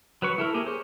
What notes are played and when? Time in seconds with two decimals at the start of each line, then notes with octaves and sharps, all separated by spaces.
0.22 F#3 B4 C#6
0.38 E4 A4 A#4
0.54 A#3 G4 G#4
0.66 C5 C#5